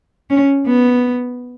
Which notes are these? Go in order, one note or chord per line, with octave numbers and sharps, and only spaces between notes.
C#4
B3